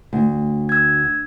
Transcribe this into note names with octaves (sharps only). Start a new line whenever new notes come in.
D2
E6 G#6